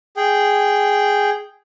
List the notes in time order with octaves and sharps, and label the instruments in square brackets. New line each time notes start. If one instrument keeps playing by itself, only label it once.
[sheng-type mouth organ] G#4 G5